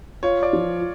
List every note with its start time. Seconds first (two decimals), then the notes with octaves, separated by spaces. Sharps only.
0.23 F4 C#5
0.43 D5
0.53 F3